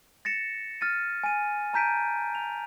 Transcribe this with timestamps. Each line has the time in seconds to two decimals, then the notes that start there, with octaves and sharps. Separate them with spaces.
0.25 A6 A#6 C#7 E7
0.81 F6 A6 D#7
1.24 G#5 D#7
1.73 A5 A#5 G6 B6 D7 D#7
2.35 F7